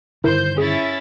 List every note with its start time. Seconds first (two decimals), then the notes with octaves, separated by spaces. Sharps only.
0.24 G2 D3 D#3 E4 A#4 C5 G6
0.58 C#4 E4 G#4 A6